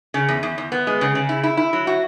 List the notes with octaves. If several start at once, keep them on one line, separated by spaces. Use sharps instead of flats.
C#3
E2
E2
E2
B3
G#3
C#3
C#3
E4
E4
E4
F#3
F#4